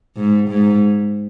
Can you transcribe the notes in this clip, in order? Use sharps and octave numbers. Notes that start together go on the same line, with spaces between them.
G#2
G#2